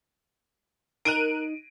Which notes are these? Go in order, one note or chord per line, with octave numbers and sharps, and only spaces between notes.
D#4 A#4 F#6 D7 D#7